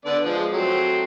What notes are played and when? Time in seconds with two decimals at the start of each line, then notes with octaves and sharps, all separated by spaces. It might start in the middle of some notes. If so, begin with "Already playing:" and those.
0.05 D3 B3 D5
0.24 F3 G#3
0.53 F#3 A3 C4